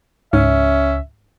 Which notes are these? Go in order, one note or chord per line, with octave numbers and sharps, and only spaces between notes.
C#2 G#2 C#4 E5